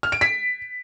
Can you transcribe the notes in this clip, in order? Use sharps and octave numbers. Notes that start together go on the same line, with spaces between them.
F6
D7
B6